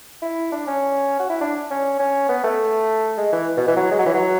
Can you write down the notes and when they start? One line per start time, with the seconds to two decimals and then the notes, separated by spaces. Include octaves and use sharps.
0.22 E4
0.52 D4
0.67 C#4
1.19 F#4
1.29 E4
1.41 D4
1.70 C#4
1.99 C#4
2.29 B3
2.44 A3
3.17 G#3
3.32 E3
3.57 B2
3.68 E3
3.76 F#3
3.91 G#3
3.99 F#3
4.06 E3
4.14 F#3